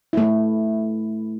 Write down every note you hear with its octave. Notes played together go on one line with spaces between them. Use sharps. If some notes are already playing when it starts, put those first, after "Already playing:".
A3 E4